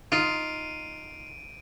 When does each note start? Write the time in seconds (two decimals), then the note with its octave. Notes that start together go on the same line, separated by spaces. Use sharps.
0.12 D#4 F4 D7 D#7